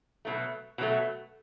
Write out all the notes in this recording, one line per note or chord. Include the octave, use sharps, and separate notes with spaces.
B2 F#3 A3
B2 F#3 A3